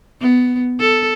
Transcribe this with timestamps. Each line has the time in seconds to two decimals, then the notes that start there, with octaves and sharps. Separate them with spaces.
0.21 B3
0.80 A4